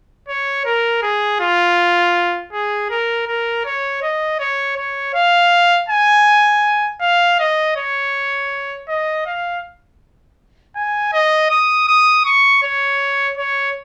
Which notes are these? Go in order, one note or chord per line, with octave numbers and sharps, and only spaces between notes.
C#5
A#4
G#4
F4
G#4
A#4
A#4
C#5
D#5
C#5
C#5
F5
G#5
F5
D#5
C#5
D#5
F5
G#5
D#5
D#6
D#6
C#6
C#5
C#5